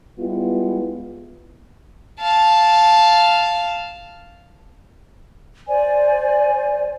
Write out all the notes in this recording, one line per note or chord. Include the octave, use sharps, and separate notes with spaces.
G3 G#3 B3 E4 F4
F5 A5
C5 D5 G#5